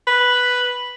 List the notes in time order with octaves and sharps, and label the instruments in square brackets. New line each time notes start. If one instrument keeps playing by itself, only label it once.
[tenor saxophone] B4